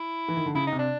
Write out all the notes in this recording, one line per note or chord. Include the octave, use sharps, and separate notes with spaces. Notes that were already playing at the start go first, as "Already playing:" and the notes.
Already playing: E4
E3
D#3
D3
C#3 E4
D#4
C3
D4